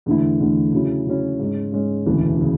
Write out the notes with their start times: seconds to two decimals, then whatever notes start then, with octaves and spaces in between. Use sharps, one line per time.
0.06 E2 D3 A3 E4
0.40 E2 D3 A3 E4
0.73 C#3 F#3 C#4 E4
1.07 C#3 F#3 C#4 E4
1.39 G#2 G#3 C#4
1.72 G#2 G#3 C#4
2.06 E1 D2 C#3 E3
2.39 C#3 E3